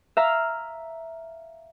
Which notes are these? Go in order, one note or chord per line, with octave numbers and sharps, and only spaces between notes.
E5 F5 A#5 F6